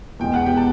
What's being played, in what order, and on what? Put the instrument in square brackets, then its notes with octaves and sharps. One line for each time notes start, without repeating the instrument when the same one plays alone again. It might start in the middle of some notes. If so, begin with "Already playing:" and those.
[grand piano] E2 B2 G#3 [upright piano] G5
[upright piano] F#5
G4 G5
A5